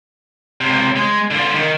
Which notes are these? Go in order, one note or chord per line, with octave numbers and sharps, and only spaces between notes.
C#2 C3
G#3
D3 F4
D#3